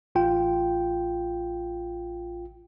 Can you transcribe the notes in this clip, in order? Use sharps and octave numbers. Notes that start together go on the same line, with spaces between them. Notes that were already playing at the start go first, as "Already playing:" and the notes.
A1 F4 G5